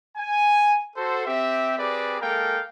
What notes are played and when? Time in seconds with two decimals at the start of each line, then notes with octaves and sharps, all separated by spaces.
0.17 G#5
0.96 F#4 A4 C5
1.26 C4 G4 E5
1.78 C4 G4 G#4 B4 D5
2.20 G#3 A#3 A4 A#4 F5 G5